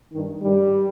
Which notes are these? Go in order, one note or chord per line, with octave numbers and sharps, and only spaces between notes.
G2 D#3
G2 D#3 G3